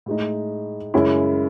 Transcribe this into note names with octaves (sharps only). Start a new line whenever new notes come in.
A2 G#3 D#4
F#2 C#3 G#3 C#4 E4